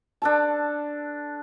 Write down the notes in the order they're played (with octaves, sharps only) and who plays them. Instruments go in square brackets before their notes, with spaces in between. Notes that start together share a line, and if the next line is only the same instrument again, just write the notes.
[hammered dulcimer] D4 A4 A5